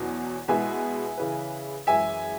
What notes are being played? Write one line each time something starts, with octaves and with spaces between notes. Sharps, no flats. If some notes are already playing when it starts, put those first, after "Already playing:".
Already playing: E2 B2 F#3 C#4
B2 G#3 E4 G#4 B4 E5 G#5
C#3 E3 C#4 G#4 B4
F#2 E3 G#3 E4 B4 E5 G#5